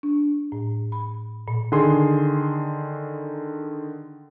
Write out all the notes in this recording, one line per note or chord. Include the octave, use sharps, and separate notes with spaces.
D4
A2
B5
A#2
D3 D#3 G#4 C6